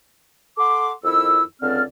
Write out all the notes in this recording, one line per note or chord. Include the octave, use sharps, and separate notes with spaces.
A4 F#5 C6 D6
F2 D#3 E4 E6
C#2 D3 C4 D5 F6